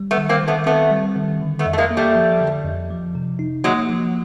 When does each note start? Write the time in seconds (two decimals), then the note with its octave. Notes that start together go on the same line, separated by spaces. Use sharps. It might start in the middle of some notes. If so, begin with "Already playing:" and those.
Already playing: G3
0.11 A3 B3
0.18 D#3
0.29 A#3 C4
0.43 D#3
0.48 A3 B3
0.66 A3 B3 C4
0.91 G3
1.16 D#3
1.41 D3
1.59 A3 B3
1.66 F2
1.73 A3
1.78 G#3 A#3
1.91 A#3
1.97 G3 A3
2.15 F3
2.41 D3
2.65 F2
2.91 F3
3.15 C3
3.39 D#4
3.64 F#3 G#3 A#3
3.89 F3